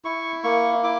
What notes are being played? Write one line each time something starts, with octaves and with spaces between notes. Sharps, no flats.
E4 C#6
A#3 C#6
E4 D6